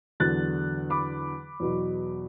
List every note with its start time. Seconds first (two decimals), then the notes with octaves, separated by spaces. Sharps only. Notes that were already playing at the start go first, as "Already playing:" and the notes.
0.20 E2 D3 F#3 F#6 A6
0.90 B5 D6
1.60 E2 B2 F#3